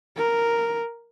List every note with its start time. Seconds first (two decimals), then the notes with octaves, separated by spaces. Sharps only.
0.16 A#4